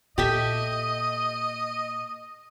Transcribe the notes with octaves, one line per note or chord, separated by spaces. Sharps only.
A#2 G4 A4 D#5 E5